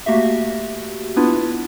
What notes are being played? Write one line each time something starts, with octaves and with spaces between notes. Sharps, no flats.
A3 A#3 F#4 G4 E5
B3 D4 E4 F4 B4